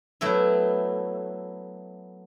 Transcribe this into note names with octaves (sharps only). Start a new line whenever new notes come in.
F#3 A3 B3 E4